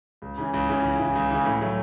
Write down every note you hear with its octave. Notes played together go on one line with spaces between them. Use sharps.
C#2
C#3 E3
C#2
C#3 E3
C#2
C#3 E3
C#2
C#3 E3
A2
F#3 A3